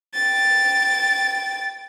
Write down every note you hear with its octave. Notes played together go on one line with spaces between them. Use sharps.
G5 A6